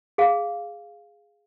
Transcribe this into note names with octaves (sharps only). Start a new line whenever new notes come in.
G#4 F5